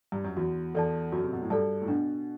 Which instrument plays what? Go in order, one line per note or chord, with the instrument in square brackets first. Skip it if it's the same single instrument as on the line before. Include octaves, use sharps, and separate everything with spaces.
[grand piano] G2
F#2
[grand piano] E2 [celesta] F#4
[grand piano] E2 [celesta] A4 D5 A5
[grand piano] F#2 [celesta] F#4
[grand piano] C3
B2
A2
[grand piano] G2 [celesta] A4 D5 A5
[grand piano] A2
[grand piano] B2 [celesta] D4